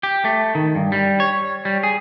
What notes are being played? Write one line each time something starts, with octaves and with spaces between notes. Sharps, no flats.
G4
A3
D#3
G2
G3
C#5
G3
G#4